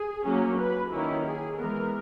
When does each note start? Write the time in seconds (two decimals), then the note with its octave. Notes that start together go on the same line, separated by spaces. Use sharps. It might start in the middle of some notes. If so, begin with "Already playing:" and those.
Already playing: G#4
0.25 F#3 A#3 C#4
0.58 B4
0.91 D#3 A#3 C#4 E4
1.24 G#4
1.57 E3 G#3 B3 A#4